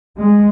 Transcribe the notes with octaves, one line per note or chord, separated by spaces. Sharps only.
G#3